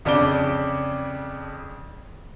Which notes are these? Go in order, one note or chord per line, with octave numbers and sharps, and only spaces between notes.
F2 C#3 D4 D6 G7